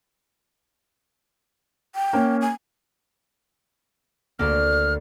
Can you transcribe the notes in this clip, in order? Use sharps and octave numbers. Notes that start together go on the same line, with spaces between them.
G5
A#3 C#4
G#5
D2 A#3 F6